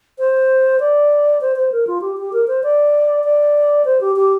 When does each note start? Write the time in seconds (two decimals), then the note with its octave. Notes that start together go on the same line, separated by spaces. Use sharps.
0.19 C5
0.80 D5
1.41 C5
1.56 C5
1.72 A#4
1.87 F4
2.01 G4
2.17 G4
2.33 A#4
2.48 C5
2.63 D5
3.24 D5
3.85 C5
4.01 G4
4.16 G4